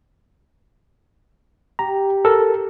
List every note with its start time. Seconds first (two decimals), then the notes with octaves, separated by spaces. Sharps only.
1.79 G4 A#5
2.25 A4 A#4